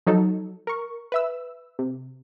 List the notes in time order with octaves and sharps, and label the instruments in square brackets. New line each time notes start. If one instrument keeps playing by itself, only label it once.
[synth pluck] F3 F#3 D#4 F#4 A4
A#4 C#6
B4 E5 E6
C3